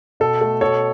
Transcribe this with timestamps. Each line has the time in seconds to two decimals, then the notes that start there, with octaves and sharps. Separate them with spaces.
0.20 B2 A4
0.41 A3
0.61 B2 A4 C#5